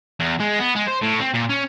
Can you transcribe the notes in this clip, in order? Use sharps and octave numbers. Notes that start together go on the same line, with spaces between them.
E2
G#3
B3
G#3
C5
A2
C4
A#2
C#4